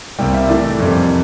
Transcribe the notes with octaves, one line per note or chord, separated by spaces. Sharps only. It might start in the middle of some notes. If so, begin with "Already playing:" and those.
C2 C3 G3 A#3 G5
E5
A2 E3 A3 D5
F2 C3 E3 G3 A#3